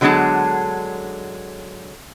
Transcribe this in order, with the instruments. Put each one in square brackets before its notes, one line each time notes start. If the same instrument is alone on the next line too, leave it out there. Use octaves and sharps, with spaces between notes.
[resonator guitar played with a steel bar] D3 F#3 G#3 B3 D4 A5